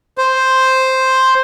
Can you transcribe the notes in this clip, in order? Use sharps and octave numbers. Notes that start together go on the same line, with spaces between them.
C5